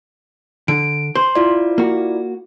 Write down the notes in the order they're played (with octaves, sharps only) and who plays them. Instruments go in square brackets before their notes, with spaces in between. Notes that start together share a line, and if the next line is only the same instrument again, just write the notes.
[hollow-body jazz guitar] D3 [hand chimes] D7
[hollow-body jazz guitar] C5 [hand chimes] C6
[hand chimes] E4 F4 D5
[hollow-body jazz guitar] A#3 F#4